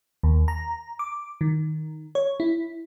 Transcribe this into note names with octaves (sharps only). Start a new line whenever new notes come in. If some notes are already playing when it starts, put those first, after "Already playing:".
D#2
A#5
D6
D#3
C#5
E4